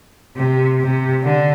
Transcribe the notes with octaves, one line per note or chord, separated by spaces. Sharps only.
C3
C3
D3